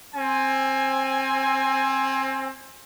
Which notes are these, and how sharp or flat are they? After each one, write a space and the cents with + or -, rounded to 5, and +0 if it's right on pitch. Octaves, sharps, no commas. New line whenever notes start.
C4 +20 G#5 +0